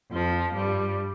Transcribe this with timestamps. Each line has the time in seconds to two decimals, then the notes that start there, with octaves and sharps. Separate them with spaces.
0.12 F2 F3
0.54 G2 G3